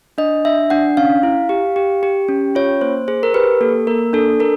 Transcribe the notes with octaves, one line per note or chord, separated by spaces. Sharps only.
D4 D#5
D4 E5
D4 F#5
C#4 F5
E4
G4
G4
G4
C#4
F4 C#5
A#3 C5
G#4 C5
A#4
G4 B4
A#3 A4
A#3 A#4
D4 A4
A4 A#4